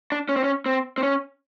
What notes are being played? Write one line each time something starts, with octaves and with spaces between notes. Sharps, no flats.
D4
C#4
C4
C#4
C4
C4
C#4